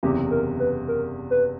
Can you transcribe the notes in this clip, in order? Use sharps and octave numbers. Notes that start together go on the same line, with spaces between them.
F#1 E2 C3 G4
A#4
B4
A#4
B4